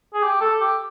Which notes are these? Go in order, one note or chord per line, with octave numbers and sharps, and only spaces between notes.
G#4
G4
A4
G4